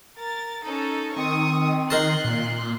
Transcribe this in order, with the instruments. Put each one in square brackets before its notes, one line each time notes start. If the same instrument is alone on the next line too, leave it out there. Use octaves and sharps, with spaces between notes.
[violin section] A#4 A6
C#4 D#4 A4
[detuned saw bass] D#3 [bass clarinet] C4 [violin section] C#6 D#6
[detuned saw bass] D#3 [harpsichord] D#4 A#4 A5 [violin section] C6 F#6
[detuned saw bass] A#2